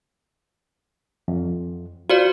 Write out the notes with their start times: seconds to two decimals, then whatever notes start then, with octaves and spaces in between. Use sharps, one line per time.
1.28 F2
2.10 F4 F#4 C5 D5